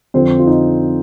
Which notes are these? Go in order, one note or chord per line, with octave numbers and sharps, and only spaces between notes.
F2 D3 F3 C4 C5
F4
D#4